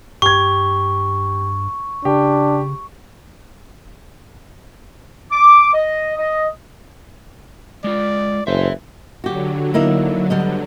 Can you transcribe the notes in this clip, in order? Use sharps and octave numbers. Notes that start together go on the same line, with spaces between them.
G2 G4 C#6 G#6
C#3 D4 G4
D6
D#5
D#5
G#3 F4 D5
F#1 B4 C5 E5
D3 F#3 F#4 G4
A#3 D#4 E4
G3 B3 D#5